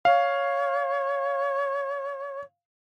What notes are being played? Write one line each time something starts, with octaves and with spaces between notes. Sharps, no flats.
C#5 F5